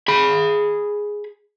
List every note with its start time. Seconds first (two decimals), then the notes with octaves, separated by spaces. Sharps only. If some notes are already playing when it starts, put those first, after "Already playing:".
0.08 G#4 B5